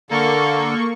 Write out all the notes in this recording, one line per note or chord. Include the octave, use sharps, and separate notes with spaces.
D3 A#3 A4 C#6